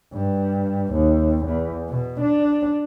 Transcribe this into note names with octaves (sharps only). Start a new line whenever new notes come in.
G2
D#2
E2
B2
D4